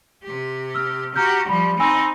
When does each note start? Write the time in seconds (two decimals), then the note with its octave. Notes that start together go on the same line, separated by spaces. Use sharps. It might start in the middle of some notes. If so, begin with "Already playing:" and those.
0.24 C3 G4
0.75 E6 F6
1.16 F#4 G4 A#5 F6 G6
1.49 F3 G3 B5
1.80 C4 D#4 G#5 B5 E6